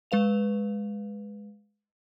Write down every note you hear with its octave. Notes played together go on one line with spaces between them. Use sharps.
G#3 B4 F5 F7